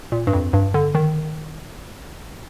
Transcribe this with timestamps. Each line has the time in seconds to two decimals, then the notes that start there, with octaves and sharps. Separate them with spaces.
0.12 A#2
0.27 G2
0.33 F2
0.53 G2
0.74 D3
0.95 D#3